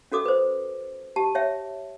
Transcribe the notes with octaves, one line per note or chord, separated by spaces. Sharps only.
C#4 F#4 A4 D6 D#6
B4 C5
G4 A5
C#5 E5 G5